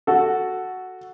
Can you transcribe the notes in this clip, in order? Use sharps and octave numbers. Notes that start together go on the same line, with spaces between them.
F#4 A4